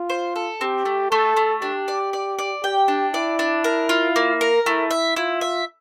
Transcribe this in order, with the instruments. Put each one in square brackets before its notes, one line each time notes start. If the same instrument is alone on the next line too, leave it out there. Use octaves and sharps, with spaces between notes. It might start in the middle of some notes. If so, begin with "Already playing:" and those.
Already playing: [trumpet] F4
[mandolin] C5
A4
[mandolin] C4 [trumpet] G4
[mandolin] A3
[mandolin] A3 [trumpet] A4
[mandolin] A3
[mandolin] D4 [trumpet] G4
[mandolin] D5
D5
D5
[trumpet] G4 [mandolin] G5
[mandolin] D4
[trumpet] E4 [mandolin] D5
[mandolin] D4
A#4
F4
A#3
A#4
[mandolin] A3 [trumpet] E4
[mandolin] E5
[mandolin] E4 [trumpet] F4
[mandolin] E5